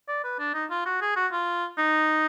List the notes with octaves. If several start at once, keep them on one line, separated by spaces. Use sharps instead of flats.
D5
B4
D4
D#4
F4
F#4
G#4
F#4
F4
D#4